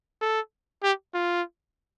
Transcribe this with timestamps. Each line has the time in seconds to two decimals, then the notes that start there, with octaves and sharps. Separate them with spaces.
0.21 A4
0.83 G4
1.14 F4